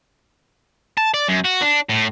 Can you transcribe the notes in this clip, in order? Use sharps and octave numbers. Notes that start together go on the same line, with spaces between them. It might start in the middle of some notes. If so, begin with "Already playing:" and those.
A5
D5
F#2
F#4
D4
A2